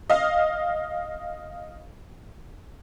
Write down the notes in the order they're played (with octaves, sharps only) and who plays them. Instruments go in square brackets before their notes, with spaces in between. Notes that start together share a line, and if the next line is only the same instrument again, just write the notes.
[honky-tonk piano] D#5 F5